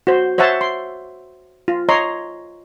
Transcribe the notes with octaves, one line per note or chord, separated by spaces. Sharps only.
F#4 C5
C5 C#5 E5 F#5 A5
C6
F4
C#5 D#5 A#5 C6